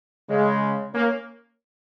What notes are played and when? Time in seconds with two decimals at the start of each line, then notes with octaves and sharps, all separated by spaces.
0.30 C#3 G#3
0.94 A#3 C#4